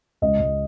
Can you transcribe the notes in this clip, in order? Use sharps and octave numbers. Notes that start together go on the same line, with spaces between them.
C#2 D#5
C#2